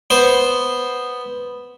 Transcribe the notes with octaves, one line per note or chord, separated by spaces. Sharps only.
B3 C5